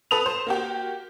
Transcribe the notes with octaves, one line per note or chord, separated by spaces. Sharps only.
A4 B4 D#6 F7
C5
A#3 F#4 G4